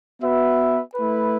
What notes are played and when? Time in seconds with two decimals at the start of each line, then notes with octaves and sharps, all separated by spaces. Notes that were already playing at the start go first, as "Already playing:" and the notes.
0.22 B3 F#4 B4 E5
0.94 A3 E4 B4